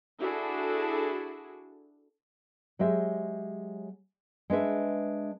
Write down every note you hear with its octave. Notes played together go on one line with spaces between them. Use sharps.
D4 E4 F#4 G#4 A4
F#3 G#3 G4 E5
G#3 D4 B4 E5